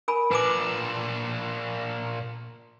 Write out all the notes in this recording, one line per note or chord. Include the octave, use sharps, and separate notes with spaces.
A#4 G#5 B5
A#2 D4 B4 G#5 D6